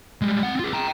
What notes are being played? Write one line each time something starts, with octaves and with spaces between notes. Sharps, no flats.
G3 G#3
C4 F#5
F4 G#4
G5 A#5